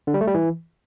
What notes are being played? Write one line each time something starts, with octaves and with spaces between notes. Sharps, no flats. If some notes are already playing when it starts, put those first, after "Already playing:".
D3
G3
A3
G3
E3